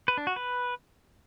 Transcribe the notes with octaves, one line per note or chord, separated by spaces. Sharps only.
B4
D4
F#4
B4